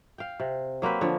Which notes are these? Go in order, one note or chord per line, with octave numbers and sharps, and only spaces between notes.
F5 G5
C3
F#3 A#3 C4 B4
D3 F3 C#5